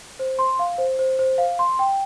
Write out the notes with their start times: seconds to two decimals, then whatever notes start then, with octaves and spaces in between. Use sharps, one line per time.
0.19 C5
0.39 C6
0.59 F5
0.78 C5
0.99 C5
1.19 C5
1.38 F5
1.59 C6
1.79 G5